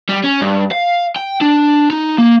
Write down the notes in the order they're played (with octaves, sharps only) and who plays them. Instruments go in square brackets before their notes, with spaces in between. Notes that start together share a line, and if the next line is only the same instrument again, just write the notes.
[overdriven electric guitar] G3
C#4
G2
F5
G5
D4
D#4
A#3